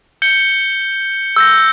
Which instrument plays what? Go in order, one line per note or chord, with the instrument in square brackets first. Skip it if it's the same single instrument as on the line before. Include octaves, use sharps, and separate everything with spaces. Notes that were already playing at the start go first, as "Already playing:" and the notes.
[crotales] G6 C#7 G7
E6 G6 A#6